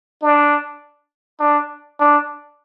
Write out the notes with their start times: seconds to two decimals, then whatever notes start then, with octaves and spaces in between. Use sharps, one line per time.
0.22 D4
1.40 D4
2.00 D4